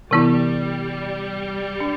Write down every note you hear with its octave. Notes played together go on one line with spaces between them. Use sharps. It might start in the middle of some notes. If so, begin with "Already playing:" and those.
C3 E3 G3 B3 E4
D4